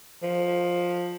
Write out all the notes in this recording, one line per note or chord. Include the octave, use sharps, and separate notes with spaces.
F3